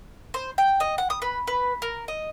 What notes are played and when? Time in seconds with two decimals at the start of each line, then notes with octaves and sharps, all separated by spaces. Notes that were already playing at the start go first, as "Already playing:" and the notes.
0.34 C5
0.58 G5
0.80 D#5
0.98 F#5
1.10 D#6
1.22 B4
1.47 B4
1.82 A#4
2.08 D#5